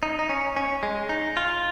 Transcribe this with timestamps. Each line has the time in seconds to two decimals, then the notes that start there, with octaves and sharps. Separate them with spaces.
0.03 D#4
0.19 D#4
0.29 C#4
0.56 C#4
0.83 G#3
1.09 D#4
1.37 F4